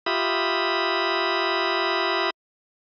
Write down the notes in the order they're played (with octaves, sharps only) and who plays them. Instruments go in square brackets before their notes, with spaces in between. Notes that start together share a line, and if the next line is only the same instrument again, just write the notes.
[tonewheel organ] F4 G4 E5 B5 D#6